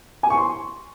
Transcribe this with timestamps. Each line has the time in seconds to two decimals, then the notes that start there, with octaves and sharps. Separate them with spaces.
0.23 G#5
0.30 C#6
0.37 C6